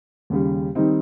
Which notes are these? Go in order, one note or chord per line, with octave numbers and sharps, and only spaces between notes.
D#2 C#3 G3
D#3 G3 C4 D#4